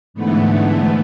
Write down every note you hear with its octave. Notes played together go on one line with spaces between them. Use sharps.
G#2 D3 E3 A3 B3